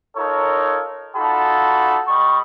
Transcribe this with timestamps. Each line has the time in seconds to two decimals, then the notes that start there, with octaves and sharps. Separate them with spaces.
0.17 D#4 F4 A4 A#4 C#5
1.16 D#4 F4 F#4 A4 A5 B5
2.08 G3 D#5 B5 C#6